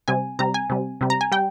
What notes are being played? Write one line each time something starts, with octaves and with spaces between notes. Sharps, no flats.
C3 G3 G#5
C3 G3 A#5
G#5
C3 G3
C3 G3
A#5
G#5
G3 G5